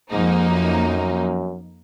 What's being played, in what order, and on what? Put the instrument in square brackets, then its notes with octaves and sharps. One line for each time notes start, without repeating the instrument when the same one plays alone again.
[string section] F2 F3 A#3 D#4 [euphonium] G#2
[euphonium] F#2